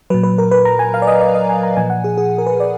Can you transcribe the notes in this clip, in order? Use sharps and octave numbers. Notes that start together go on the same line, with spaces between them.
A#2 F#3 B4
B4
A#4
B4
A#5
G#5
F5
D5
D#5
D#5
D#5
G#5
A#5
A#2 F3 G#5
F#5
G#4
G#4
A#4
B4
D5